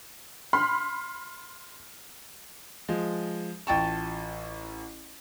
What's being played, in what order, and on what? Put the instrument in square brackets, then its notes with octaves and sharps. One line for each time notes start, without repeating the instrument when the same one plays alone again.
[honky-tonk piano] B5 C6 F6
[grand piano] F3 G#3
[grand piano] A1 C#6 [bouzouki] F4 G5 A5